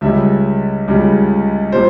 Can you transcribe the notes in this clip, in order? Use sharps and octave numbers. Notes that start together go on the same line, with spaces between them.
C#2 C#3 G3 E5
C#2 C#3 G3
A#2 G3 C5